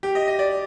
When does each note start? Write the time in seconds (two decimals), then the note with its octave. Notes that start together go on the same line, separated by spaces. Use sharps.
0.03 G4
0.15 D#5
0.28 D#5
0.39 D5